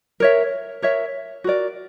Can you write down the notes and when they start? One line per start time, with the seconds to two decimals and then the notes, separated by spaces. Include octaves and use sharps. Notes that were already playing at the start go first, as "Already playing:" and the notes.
0.20 A#4 C#5 E5
0.82 A#4 C#5 E5
1.44 F#4 A#4 D5